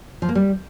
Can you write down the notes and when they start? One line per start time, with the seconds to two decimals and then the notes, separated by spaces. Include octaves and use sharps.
0.22 F3
0.29 A#3
0.35 G3